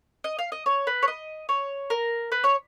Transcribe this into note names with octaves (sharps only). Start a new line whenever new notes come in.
D#5
F5
D#5
C#5
B4
C#5
D#5
C#5
A#4
B4
C#5